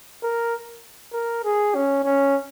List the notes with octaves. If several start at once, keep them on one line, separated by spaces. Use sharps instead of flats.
A#4
A#4
G#4
C#4
C#4